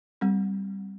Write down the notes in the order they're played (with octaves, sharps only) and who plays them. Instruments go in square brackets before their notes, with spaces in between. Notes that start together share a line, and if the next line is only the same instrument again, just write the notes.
[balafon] G3 C4